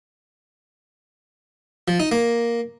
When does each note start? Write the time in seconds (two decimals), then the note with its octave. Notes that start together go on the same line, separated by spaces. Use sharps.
1.88 F3
2.00 D#4
2.12 A#3